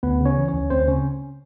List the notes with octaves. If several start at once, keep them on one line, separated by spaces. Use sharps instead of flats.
D2 B3 B4
C#3
C#4 C#5
E3
C#4 C#5
D2
D2 C4 C5
C#3 C#4 C#5